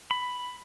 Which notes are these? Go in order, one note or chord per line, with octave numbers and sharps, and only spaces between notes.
B5